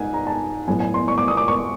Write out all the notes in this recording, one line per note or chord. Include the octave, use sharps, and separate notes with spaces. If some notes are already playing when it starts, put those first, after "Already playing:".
Already playing: G#2 G#5
A#5
A5
A2 F#3 B3 G#5
G#5
C6
C#6
D6
D#6
D6
C#6